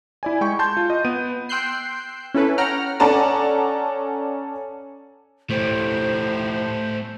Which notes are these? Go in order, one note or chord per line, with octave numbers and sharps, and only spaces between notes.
E4 D5 G#5
G#3 G5 C#6
A5 C6 G6
F4
D#5
B3 D#7
G5 C6 E6 F#6 G6 C7
C#4 E4 A4 B4
C#5 F#5 G5 A#5 F6
C#4 A4 D5 F#5 A5 A#5
A2 A3 G4 C5